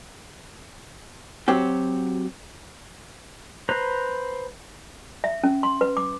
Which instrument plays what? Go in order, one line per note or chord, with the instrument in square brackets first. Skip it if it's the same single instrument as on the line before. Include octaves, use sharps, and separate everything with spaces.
[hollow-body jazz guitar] F#3 C4 F#4 G4
[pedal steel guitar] B4 C5 A#5
[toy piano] E5
C#4
C6
B4
D6